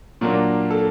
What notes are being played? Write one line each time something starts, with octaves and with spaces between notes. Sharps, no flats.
A#2 F#3 A#3 D4
A4